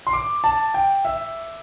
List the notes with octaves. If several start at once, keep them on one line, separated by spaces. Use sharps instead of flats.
C6
D6
A5
G5
E5